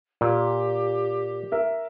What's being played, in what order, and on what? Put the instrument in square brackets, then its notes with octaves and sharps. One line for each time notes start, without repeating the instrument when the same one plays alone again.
[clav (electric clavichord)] A#2 [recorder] G4
[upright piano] A#4 E5